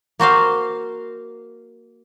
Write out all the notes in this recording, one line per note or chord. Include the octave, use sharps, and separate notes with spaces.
A#3 F#4 C5 F5